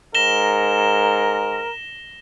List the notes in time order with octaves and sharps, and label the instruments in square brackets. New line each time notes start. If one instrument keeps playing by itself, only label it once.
[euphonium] G#2 [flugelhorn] A#4 [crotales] A#6 E7 G7